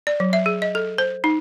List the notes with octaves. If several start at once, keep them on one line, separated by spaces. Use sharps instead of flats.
D5
F#3
E5
G#4
D#5
A4
C5
D#4